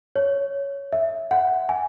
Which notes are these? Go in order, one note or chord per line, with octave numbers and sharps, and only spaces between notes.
C#5
E5
F#5
G#5